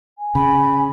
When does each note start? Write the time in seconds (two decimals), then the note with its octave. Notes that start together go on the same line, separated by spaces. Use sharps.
0.18 G#5
0.35 C#3 B5